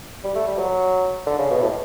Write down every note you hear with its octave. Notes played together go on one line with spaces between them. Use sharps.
G3
A3
G3
F#3
D3
C#3
B2
A2